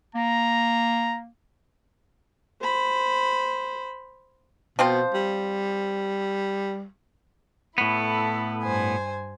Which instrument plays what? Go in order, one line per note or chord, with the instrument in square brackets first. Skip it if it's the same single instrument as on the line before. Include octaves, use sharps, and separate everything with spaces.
[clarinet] A#3 [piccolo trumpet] A#5
[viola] C5 B5
[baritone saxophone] B2 [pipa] F3 C4 C5
[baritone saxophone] G3
[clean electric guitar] A2 B3 [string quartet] E4 A4
[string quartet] G2 C5 G#5